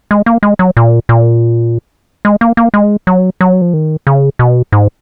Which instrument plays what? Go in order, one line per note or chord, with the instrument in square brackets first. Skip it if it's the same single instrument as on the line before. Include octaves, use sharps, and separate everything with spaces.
[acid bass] G#3
A#3
G#3
F#3
A#2
A#2
G#3
A#3
A#3
G#3
F#3
F#3
F3
D#3
C#3
B2
G#2